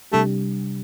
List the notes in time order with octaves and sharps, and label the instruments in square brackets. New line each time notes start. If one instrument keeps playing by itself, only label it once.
[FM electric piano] C3 G3 D4 G4 [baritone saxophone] A3